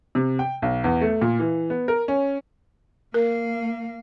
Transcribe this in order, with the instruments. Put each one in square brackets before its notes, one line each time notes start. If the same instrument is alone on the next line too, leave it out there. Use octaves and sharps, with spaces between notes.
[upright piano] C3
G5
B1
E2
A3
A#2
E3
B3
A#4
C#4
[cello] A#3 F5 [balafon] A#4